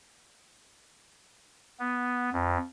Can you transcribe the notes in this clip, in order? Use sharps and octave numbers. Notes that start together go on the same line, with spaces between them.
B3
F2